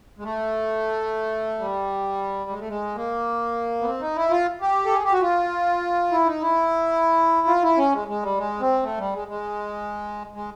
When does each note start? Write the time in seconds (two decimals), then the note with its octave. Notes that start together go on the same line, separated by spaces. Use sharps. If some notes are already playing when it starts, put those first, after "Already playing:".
0.18 G#3
0.24 A3
1.59 G3
2.50 G#3
2.59 A3
2.68 G#3
2.95 A#3
3.81 B3
3.86 C4
4.01 D#4
4.16 E4
4.31 F4
4.61 G4
4.86 A4
4.94 G#4
5.04 G4
5.12 F#4
5.21 F4
6.12 E4
6.27 D#4
6.41 E4
7.47 F4
7.63 E4
7.78 C#4
7.93 G#3
8.08 G#3
8.23 G3
8.38 G#3
8.60 C4
8.83 A3
8.98 G3
9.13 G#3
9.28 G#3
10.34 G#3